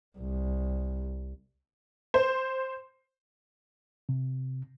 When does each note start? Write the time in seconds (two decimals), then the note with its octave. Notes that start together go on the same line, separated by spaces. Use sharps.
0.18 C2
2.14 C5
4.09 C3